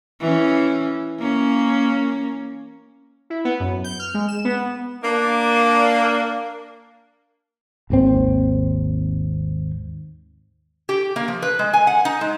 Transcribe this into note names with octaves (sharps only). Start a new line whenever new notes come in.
E3 C#4
A#3 C#4
E4
B3
F#2
G6
F6
G#3
E7
B3
A#3 D4
G#1 D#2 C4
G4
A#3
F3
B4
G#3
G#5
F#5
D#4
G#3